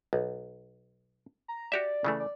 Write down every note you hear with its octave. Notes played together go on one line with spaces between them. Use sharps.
B1
A#5
F#4 G4 D5 E5
C#3 E3 A3
D5